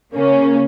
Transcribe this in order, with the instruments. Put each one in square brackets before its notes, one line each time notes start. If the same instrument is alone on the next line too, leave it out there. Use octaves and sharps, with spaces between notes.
[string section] C#3 A#3 C#4